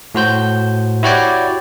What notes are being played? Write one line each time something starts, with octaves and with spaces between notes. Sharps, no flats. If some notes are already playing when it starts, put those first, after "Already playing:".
A2 F#4 C5 G6
E4 F#4 G4 C#5 D5 G5